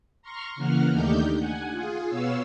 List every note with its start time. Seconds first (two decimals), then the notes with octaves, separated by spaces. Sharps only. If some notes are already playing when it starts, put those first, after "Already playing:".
0.22 A#5 C6 C#6 F6
0.55 C#3 E3 A#3 F#5 F6
0.90 D#2 A3 D4 D#4 G4 G6
1.38 F#5 G#5
1.71 F4 G#4
2.08 B2 B3 C#5 F5 E6